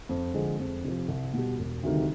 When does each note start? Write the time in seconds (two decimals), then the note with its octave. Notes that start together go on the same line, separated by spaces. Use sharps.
0.09 F2
0.34 D3 F3 G#3
0.59 F2
0.84 C3 F3
1.08 C2
1.33 B2 G3
1.59 E1
1.83 D2 C3 D#3 G3